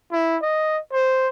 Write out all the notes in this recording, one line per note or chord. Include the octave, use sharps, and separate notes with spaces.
E4
D#5
C5